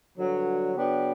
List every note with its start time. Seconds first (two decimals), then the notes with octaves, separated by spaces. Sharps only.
0.17 G2 D3 F#3
0.74 C#3 F#3 B3 D4 G4